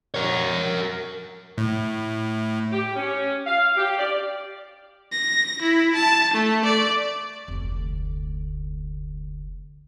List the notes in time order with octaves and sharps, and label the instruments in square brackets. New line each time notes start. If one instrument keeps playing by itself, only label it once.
[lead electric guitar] A#4 C#5
[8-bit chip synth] A2
[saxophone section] G4
C#4
F5
G4
D5
[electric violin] A#6
E4
A5
A3
D5
[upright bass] F1 D2